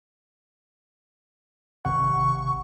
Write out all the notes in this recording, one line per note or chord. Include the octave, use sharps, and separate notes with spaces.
G#1 C3 F#5 C#6